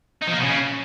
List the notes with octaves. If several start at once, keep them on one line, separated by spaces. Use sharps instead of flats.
D#4
F3
A#3
B2
C#3